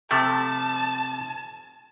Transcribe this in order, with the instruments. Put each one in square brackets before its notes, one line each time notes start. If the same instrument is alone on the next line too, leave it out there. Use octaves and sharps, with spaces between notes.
[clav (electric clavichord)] C3 F3 A3 [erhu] A5